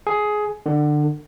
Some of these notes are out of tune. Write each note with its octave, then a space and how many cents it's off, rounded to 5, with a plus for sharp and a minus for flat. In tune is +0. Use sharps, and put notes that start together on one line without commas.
G#4 +15
D3 +25